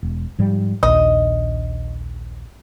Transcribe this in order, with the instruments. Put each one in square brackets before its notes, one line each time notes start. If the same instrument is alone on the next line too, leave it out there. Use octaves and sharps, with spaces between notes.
[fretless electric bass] E1
G#2 F3 G3
[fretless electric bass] A#1 D#2 [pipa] D#5